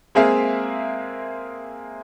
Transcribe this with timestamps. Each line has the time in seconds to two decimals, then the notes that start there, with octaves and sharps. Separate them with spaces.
0.15 G#3 A#3 C4 G#4 E5 F5